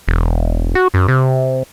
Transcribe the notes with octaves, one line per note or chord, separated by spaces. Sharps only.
E1
F#4
F#2
C3